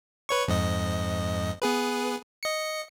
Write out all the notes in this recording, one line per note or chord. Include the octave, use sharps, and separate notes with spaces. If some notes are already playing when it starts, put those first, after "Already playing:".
B4 C#5 C#6
F2 G#2 D#5
B3 G#4 B4
D#5 C#7